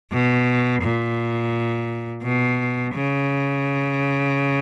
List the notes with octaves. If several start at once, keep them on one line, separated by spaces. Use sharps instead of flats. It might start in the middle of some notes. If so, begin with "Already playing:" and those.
B2
A#2
B2
C#3